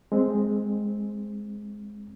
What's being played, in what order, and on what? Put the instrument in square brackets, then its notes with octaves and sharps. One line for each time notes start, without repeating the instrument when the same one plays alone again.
[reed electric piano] G#3 C4